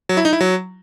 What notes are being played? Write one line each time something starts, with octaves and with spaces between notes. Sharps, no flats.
F#3
E4
D#4
E4
F#3